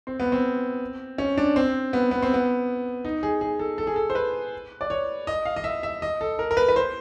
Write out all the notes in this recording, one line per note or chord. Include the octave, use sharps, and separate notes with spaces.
C4
B3
C4
C#4
D4
C4
B3
B3
C4
B3
D#4
G#4
G#4
A4
A4
G#4
A4
C5
B4
D5
C#5
D#5
F5
D#5
E5
E5
D#5
A4
A#4
A#4
B4
B4
C5